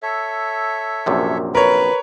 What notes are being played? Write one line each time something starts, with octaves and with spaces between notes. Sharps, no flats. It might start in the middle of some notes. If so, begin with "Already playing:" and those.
A4 C#5 E5
A#1 F#2 C3
A#4 B4 C#5